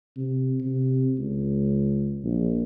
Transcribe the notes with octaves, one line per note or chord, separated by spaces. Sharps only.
C3
C3
C#2
A#1